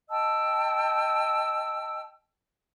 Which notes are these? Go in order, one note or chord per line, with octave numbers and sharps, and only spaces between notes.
D#5 G5 A5 E6